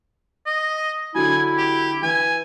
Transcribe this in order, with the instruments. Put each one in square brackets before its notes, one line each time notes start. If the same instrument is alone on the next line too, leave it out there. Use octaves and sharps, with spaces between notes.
[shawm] D#5
[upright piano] D3 F#3 [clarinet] E4 [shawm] G#5
[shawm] G4
[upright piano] E3 [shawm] G#5